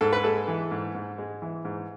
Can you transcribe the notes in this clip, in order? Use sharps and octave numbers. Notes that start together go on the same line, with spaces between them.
G#2 A4
B4
G#3 A4
E3
G#2
G#2
G#3
E3
G#2